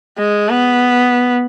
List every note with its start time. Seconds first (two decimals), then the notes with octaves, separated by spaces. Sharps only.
0.19 G#3
0.49 B3